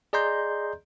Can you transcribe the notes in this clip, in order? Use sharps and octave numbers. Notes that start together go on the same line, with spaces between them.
G#4 D5 D#5 A#5 C6 G6